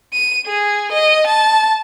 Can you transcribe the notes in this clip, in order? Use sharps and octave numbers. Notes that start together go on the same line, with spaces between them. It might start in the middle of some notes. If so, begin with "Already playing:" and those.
D#7
G#4
D#5
A5